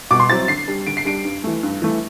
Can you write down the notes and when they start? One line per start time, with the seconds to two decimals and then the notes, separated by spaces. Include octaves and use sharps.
0.11 B2 D6
0.20 C6
0.29 F#3 C4 E4 A6
0.48 D3 C7
0.68 G3 D4
0.86 D3 D7
0.97 C7
1.05 G3 D4 D7
1.25 G2
1.44 E3 A3
1.63 G2
1.82 E3 A3